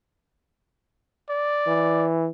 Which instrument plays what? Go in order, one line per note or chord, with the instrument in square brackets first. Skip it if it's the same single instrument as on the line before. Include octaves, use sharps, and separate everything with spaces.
[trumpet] D5
[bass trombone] E3